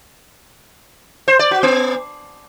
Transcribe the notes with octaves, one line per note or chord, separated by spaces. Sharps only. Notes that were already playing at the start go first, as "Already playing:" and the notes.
C5
D5
F#4
B3